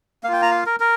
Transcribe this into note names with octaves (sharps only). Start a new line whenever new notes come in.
A#3 F4 F5 G5
A#5
F5
A#4
A#4